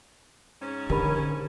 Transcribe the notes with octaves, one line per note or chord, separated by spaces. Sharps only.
G#2 C#4
D3 G4 A#4 B5